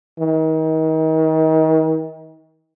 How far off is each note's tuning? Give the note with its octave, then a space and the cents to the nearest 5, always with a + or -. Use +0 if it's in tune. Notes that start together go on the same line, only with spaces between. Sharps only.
D#3 +35